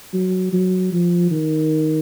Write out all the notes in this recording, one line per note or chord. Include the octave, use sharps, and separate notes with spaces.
F#3
F#3
F3
D#3